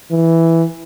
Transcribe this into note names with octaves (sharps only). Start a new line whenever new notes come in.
E3